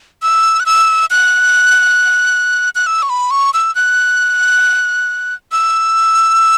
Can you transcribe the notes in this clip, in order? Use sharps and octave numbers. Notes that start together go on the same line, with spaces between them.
E6
F#6
E6
F#6
F#6
E6
C#6
B5
C#6
E6
F#6
E6